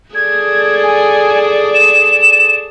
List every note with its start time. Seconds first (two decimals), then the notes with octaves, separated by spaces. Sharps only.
0.15 G#4 A4 D5 G#6
0.83 G#5
1.74 E7